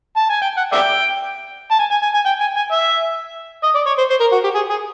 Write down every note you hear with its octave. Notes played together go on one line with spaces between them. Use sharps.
A5
G#5
G5
F#5
D5 E5 G5
A5
G#5
G#5
G#5
G#5
G5
G#5
G#5
E5
D#5
D5
C#5
C5
C5
A#4
F#4
G4
G#4
G#4